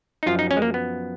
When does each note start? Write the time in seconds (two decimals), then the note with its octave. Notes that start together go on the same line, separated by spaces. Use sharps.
0.23 D#4
0.26 F#2 F3 F4
0.39 D#4
0.51 C#4
0.57 G#3
0.62 A#3
0.74 B3